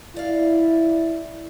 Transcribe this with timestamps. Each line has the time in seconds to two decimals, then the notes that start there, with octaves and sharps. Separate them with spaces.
0.16 E4 D5 F5